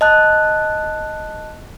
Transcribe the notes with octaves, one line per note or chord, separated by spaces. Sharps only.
D#5 A5 F#6